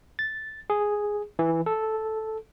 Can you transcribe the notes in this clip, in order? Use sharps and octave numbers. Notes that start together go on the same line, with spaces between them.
A6
G#4
E3
A4